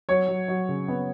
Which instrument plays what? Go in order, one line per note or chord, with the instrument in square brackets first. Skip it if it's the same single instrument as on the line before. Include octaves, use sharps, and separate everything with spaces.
[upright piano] F#3 C#5
F#3
F#3
C#3
B3